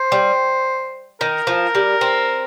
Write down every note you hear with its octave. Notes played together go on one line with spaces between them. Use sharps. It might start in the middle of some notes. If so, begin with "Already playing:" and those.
Already playing: C5
G3
D#3 A#4
F3
G3
C4